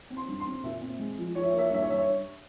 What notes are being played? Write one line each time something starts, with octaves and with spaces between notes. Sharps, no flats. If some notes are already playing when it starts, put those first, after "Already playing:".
C4
C6
G2
C6
C4
A#2 E5
C4
G#3
F3
F3 C#5
E5
A#3 C#5
E5
C#5
G2 E5
C#5
G2 E5
C#5